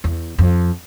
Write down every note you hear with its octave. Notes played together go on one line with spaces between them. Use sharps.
E2
F2